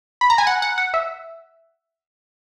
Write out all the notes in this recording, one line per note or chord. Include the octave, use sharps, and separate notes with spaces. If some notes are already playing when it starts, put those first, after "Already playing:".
B5
A#5
G#5
F#5
F#5
F#5
E5